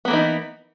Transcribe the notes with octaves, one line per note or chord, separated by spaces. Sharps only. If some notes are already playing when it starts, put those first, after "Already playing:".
E3 A#3 B3 D#4